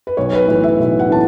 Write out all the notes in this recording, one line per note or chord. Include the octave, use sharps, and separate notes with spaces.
B4
B1 C#5
B4
A2 E3 B4
E5
B1
F#5
A2 E3 A5